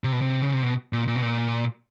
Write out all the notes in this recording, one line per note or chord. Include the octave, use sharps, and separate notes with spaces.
C3
B2
C3
C#3
C3
B2
A#2
A#2
B2
A#2